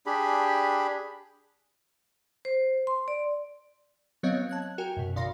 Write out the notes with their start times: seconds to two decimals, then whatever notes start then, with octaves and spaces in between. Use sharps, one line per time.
0.06 D4 G4 G#4 B5
2.45 C5
2.87 C6
3.08 D5
4.23 F#3 B3 C4 C#5 D#5 F5
4.49 A5 F#6 G#6
4.62 F#6
4.78 F#4 A#4 G5 G#5
4.97 F#2 B2
5.16 G#1 C#3 D5 F5 C6 A#6